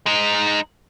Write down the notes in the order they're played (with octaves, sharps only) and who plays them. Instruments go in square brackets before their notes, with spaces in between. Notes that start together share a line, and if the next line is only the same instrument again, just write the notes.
[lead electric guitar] G#3 D#4